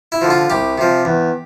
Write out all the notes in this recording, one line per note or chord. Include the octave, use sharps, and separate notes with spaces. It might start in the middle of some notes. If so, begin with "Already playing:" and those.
E4
D3 F3
F4
C2 G4
C3 F3
E2